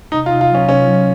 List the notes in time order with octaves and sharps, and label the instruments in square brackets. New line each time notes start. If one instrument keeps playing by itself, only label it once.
[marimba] C3 [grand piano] D#4
[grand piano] F4
[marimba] C3
[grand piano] F4
[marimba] F#3 [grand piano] C#4
[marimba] C3 [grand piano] C#4
[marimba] F#3